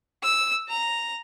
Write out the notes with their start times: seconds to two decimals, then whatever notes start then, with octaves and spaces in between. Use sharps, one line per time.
0.22 E6
0.69 A#5